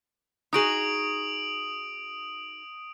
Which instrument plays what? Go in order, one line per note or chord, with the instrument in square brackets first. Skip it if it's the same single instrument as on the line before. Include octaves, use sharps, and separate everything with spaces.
[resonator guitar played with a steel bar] D#4 F#4 G#4 [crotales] D#6 D7 F#7